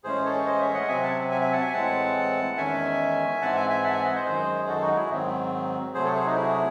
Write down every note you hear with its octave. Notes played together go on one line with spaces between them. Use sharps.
A2 E3 G#3 C#4 G#4 C5
A4 C#5
C5 D#5
C#5 E5
D#5 F#5
C3 F#3 C4 E5 G#5
F#5 A5
E5 G#5
E5 G#5
F#5 A5
E5 G#5
A2 E3 G#3 C4 F#5 A5
E2 D#3 G#3 C#4 E5 G#5
G#2 E3 C4 F#5 A5
E5 G#5
E5 G#5
F#5 A5
E5 G#5
D#5 F#5
C5 D#5
F#2 D#3 G#3 G#4 C5
F#4 A4
D#4 F#4
E4 G#4
G#2 D#3 F#3 C4
C3 F#3 A3 G#4 C5
A4 C#5
G#4 C5
D#4 F#4
E4 G#4